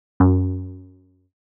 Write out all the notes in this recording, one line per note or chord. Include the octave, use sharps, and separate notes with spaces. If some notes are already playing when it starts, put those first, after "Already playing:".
F#2